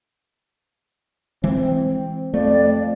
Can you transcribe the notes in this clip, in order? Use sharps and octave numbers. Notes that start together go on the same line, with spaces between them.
E3 G#3 C4
F2 A3 D5